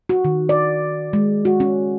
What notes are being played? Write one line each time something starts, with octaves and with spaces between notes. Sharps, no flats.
F#4
D#3
D5
G#3
F#4
C#4